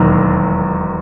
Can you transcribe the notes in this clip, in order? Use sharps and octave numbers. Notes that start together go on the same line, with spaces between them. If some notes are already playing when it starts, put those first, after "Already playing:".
Already playing: E1 D#2 D#3 F#3